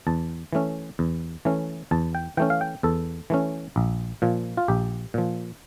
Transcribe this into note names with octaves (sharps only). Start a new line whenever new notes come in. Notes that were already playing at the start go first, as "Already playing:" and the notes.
E2 A5
E3 A3 C#4
E2
E3 A3 C#4
E2 A5
G5
E3 A3 C#4 G5
F5
G5
E2 A4
E3 A3 C#4
A#1
A#2 F3
F4
A#1 G4
A#2 F3